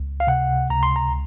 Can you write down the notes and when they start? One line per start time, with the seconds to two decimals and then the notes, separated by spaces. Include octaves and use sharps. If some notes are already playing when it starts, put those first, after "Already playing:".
Already playing: C#2
0.20 F5
0.27 C3 F#5
0.70 C#2 A#5
0.83 C6
0.96 A#5